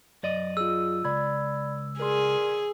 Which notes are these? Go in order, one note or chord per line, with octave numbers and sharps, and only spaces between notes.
F#2 D5 D#5
F4 G#4 E6
C#2 D5 B5 G#6
G#4 A#4 D5 C6